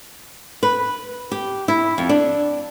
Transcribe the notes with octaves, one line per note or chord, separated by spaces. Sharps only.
B4
G4
E4
F2
D4